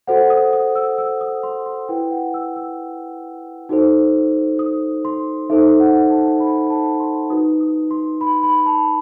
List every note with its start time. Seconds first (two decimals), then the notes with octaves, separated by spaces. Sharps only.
0.07 F#4 A4 C5 F#5
0.30 D#6
0.53 D#6
0.75 E6
0.98 E6
1.21 D#6
1.43 C6
1.66 C6
1.88 E4 B4 G5
2.11 F#5
2.34 E6
2.56 E6
3.69 D#4 F#4 A4 C5
4.59 D#6
5.05 C6
5.50 D#4 A4 C5 E5
5.80 F#5
6.10 A5
6.40 B5
6.70 A5
7.00 C6
7.30 D#4 F#4 B4 D#6
7.60 D#6
7.91 C6
8.21 B5
8.43 B5
8.66 A5